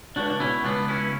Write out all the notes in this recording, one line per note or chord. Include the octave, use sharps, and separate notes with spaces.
C#2 D4 F#4
D4
B2 C#4 E4
C#2 B3 D4
B2 C#4 E4